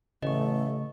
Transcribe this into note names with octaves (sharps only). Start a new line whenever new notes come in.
A1 C#3 A3 D#5 C#6